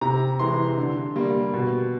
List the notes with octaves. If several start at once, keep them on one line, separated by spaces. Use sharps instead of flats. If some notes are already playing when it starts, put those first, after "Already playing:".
C3 A#5
E3 G#3 C6
D3
G3 A#3
B2